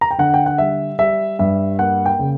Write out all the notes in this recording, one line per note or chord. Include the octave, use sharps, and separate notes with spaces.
A#5
G5
D3 F#5
G5
F#5
G3 E5
G3 E5
G2 E5
A#3 F#5
G5
C#3